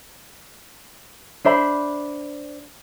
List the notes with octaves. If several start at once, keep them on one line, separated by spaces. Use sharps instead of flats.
D4 C5 E5 B5